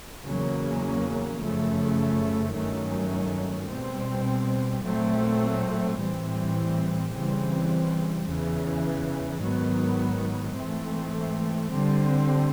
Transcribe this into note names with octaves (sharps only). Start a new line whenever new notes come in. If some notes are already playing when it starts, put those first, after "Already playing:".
E2 C#3 F#3 A#3 C#4
F#2 C#3 F3 A3
G2 D#3 F#3 A3 C#4
B2 G3 C4
A#2 F#3 A3 C4
A2 E3 G3 C4
C#3 E3 G3 C4
E2 C#3 E3
G#2 D#3 F#3 B3
G#2 E3 A3 C4
D3 G3 C4